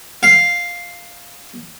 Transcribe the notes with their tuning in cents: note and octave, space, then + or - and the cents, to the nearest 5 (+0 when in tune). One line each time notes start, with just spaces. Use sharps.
F5 +0